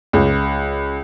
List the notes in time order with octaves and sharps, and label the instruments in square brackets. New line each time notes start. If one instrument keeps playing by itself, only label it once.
[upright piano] C#2